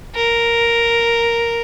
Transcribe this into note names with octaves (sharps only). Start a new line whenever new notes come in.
A#4